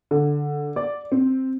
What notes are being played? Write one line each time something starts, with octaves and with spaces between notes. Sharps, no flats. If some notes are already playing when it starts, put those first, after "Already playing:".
D3
D5
C4